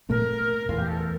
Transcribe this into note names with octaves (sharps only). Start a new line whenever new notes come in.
A#2 A3 C4 A#4
E2 E3 A3 F4
G4
A4
A#4